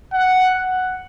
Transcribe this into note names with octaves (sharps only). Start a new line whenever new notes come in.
F#5